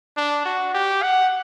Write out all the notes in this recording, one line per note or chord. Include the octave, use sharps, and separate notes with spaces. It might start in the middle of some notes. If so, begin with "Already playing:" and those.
D4
F#4
G4
F#5